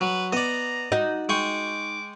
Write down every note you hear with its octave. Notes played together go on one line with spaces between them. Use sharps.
F#3 B4
B3 D5 D#5 A#5
D#4 F#4
G#3 G5 C#6 D6